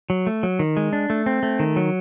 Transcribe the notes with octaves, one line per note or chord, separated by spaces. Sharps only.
F#3
A3
F#3
D#3
G#3
D4
A3
C4
A3
D#3
F#3